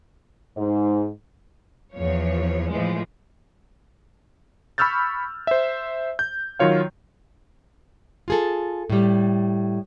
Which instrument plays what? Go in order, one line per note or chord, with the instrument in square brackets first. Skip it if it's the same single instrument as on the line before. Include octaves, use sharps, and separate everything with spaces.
[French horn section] G#2
[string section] E2 F3 C#5
A2 E3 F3 G#3
[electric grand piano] B5 C#6 E6 F6 G6 A6
C5 E5
G6
D#3 F#3 F4 C#5 F5
[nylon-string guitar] F4 G#4 A4
A2 G3